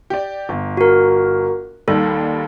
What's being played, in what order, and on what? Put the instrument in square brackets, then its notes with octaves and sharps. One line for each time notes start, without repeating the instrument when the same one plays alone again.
[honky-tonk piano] G4 D5
G1
[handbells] F#4 A#4
[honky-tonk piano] D#2 D#3 G3 [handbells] A4